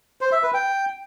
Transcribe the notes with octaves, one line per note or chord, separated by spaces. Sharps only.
C5
E5
B4
G5